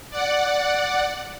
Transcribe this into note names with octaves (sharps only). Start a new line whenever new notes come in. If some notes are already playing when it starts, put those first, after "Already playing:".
D5 F#5